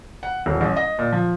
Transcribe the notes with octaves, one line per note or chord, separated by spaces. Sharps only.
F#5
D#1
A1
D#5
A#2
F3